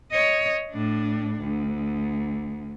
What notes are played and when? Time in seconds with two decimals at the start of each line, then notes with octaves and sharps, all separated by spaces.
0.11 C#5 D#5
0.70 A2 D4
1.40 D2